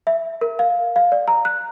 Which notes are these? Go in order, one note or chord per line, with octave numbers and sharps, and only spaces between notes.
E5
A#4
F5
F5
D5
A#5
F#6